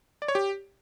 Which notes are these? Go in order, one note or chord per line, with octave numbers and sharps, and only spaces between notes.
D5
C#5
G4